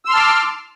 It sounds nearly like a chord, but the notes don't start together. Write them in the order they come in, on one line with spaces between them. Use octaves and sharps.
E6 C6 F6 A5 D6